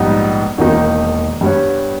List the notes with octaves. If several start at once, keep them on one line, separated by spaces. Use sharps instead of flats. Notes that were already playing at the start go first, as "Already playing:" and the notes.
Already playing: A#1 G#2 G3 B3 D#4
E1 E2 D#3 A#3 D#4
G2 G3 B3 G4 C#5